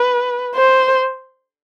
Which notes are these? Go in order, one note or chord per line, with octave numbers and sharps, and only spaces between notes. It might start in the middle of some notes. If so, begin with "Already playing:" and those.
Already playing: B4
C5